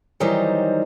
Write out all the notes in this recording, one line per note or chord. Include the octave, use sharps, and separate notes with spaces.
D#3 E3 F#3 G3 D#4 C5